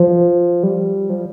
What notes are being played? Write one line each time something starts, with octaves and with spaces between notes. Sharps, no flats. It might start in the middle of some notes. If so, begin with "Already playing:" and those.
Already playing: F3
G3
F3